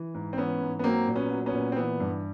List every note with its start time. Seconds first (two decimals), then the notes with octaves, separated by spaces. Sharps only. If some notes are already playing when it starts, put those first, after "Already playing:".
Already playing: E3
0.15 G#2
0.33 C4
0.38 E3 B3 C#4
0.61 G#2
0.79 B3
0.84 F#3 A#3 C4
1.08 A#2
1.15 B3 C#4
1.31 F#3
1.46 B3 C#4
1.53 A#2
1.72 C4
1.76 E3 B3
2.00 G2